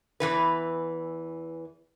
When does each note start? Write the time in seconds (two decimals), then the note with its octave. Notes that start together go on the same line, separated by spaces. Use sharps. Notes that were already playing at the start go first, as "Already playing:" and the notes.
0.20 E2 C#3 E3 B4